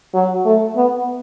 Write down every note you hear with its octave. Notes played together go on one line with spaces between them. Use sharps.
F#3
A3
B3